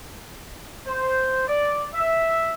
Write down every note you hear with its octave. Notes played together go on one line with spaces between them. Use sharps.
C5
D5
E5